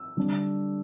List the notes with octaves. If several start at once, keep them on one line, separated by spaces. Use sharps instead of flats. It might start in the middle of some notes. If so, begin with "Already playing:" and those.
Already playing: E6
D3 G3 D4